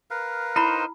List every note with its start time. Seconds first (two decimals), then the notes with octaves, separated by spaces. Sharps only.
0.11 A#4 B4 F5
0.56 D#4 E4 C5 B5